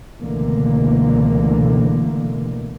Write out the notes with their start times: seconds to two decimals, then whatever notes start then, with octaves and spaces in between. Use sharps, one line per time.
0.20 C#2 B2 D3 E3 A3 A#3